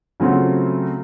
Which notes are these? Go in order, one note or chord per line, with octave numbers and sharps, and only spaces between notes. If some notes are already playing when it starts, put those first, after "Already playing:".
C#3 F#3 A3 C4 F4